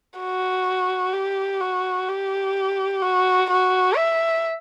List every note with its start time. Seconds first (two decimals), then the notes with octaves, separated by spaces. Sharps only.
0.19 F#4
1.13 G4
1.60 F#4
2.09 G4
3.02 F#4
3.50 F#4
3.96 E5